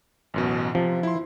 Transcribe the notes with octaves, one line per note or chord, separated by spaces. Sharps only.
A1 F#2 B2
C3 F3
E4 C6